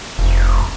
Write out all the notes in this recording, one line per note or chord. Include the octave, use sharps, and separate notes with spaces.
F1